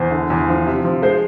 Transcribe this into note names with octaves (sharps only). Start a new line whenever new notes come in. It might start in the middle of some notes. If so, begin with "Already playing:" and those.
Already playing: E2 C5
D3
E2
F3
C3
F3
G#3 C5